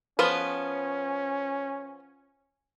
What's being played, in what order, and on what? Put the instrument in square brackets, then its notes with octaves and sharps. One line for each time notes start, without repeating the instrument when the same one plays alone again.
[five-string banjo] F3 B3 B4 [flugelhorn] C#4